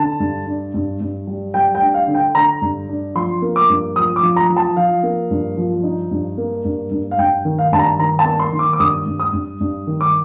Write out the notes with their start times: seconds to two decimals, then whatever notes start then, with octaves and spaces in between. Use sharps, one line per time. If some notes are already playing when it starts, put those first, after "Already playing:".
Already playing: D3 A5
0.20 G2
0.46 D4
0.74 G2
1.01 G2
1.27 G3
1.54 G3 G5
1.75 G5
1.81 D4
1.94 F5
2.08 D3
2.14 G5
2.35 D3 A#5
2.62 G2
2.89 D4
3.15 F3 C6
3.42 A#3
3.56 D6
3.69 G2
3.96 F3 D#6
4.16 D6
4.23 F3
4.36 A#5
4.50 F3
4.57 A5
4.77 F3 F5
5.03 A#3
5.30 G2
5.57 F3
5.83 D#4
6.11 G2
6.38 A#3
6.65 G2
6.91 G2
7.11 F5
7.19 G2 G5
7.45 D#3
7.59 F5
7.72 G2 A5
7.79 A#5
7.99 D#3 A#5
8.19 A5
8.25 A#3
8.40 C6
8.52 D#3
8.59 D6
8.73 D6
8.80 G2 D#6
9.06 G2
9.20 D#6
9.33 G2
9.61 G2
9.87 D#3
10.01 D6